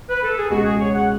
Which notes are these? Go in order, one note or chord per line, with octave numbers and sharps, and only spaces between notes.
B4
A4
G#4
C#2 B2 G#3 F#4
G#4
C#5
F#5